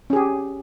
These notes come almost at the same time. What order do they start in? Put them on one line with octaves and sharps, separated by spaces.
C#4 G#4 G4